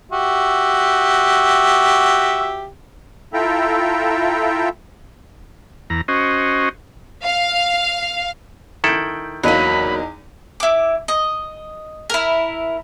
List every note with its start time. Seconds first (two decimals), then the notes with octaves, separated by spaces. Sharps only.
0.11 F#4 G4 E5
3.33 E4 F4 A4 E5 G5 A#5
5.90 E2 A#5
6.08 C#4 F#4 C5 D#5
7.24 F5
8.84 D#3 E4 A4 G6 D7 F#7
9.43 E2 F#3 A#3 D#4 B5 D#7
10.60 E4 D6
11.08 D#5
12.10 E4 A#4